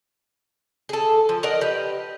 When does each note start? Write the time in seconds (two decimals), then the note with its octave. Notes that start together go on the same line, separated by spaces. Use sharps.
0.89 G#4 A4
1.29 F3
1.43 A#4 D5 D#5 F#5
1.61 G4 B4